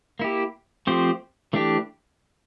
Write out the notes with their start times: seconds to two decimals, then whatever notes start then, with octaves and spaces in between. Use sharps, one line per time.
0.19 A#3 E4 G4
0.87 F3 A3 C4 G4 C5
1.53 E3 A3 D4 G4